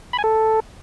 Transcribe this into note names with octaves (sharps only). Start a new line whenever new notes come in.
B5
G#5
A4